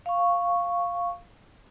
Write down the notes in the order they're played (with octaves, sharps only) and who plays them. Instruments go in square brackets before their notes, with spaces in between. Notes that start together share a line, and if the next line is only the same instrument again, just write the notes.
[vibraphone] F5 C#6